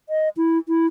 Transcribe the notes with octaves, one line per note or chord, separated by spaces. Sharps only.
D#5
E4
E4